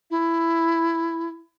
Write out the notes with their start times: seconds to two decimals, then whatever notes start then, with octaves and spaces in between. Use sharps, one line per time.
0.10 E4